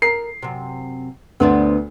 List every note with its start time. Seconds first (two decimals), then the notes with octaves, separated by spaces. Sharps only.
0.02 A#4 C7
0.42 F#2 C3
1.40 D2 B3 C4 D4